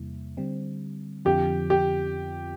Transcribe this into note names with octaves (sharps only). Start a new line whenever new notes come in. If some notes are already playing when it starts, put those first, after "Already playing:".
Already playing: E2 C3 G3 A#3 E4
D3 G3 C4
F2 D3 F3 C4 F4 G4
G4